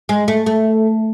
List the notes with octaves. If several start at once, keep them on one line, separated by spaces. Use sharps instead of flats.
G#3
A3
A3